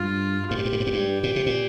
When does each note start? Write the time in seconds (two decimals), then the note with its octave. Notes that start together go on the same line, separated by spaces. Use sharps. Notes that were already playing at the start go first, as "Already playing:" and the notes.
Already playing: G2 F4
0.51 G2 G4
0.58 G#2
0.65 G2
0.73 G#2
0.80 G2
0.87 G#2
0.93 G2
1.23 A#2
1.36 C3
1.46 A#2